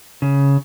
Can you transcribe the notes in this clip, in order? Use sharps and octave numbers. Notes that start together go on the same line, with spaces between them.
C#3